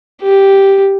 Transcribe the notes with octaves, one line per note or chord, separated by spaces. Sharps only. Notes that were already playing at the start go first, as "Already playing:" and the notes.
G4